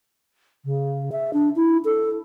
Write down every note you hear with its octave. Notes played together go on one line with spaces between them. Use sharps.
C#3
E5
D4
E4
A4